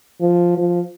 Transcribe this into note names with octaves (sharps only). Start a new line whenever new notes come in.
F3
F3